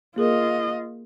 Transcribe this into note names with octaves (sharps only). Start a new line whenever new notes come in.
A#3 F4 G#4 A#4 D#5